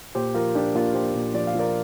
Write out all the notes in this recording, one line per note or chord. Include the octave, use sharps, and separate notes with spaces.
A#2 G4 C5
F3 F4 A#4
F3 D4 G4
A#2 F4 A#4
A#2 G4 C5
A#2
F3 D5
F5
F3 A#4 D5